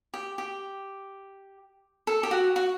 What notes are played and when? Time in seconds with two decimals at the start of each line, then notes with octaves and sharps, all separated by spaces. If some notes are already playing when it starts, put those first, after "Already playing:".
0.14 G4
0.38 G4
2.07 A4
2.23 G4
2.31 F#4
2.56 F#4